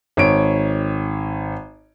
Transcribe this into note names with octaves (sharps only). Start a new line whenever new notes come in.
G#1 C#5 D7